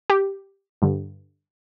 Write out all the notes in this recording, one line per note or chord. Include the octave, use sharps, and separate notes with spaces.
G4
G2 D3